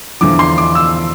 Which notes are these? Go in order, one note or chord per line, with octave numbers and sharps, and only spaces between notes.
E2 D3 F3 D6
C6
D6
E6